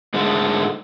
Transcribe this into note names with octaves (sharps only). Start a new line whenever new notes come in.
G#2 D3 G#3 A3